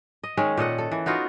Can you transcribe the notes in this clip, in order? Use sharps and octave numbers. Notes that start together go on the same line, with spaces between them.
D#5
D#3 G#3 C#4
A#2 A4 D#5 F#5
A4
E3
B3 D#4 F4 F#4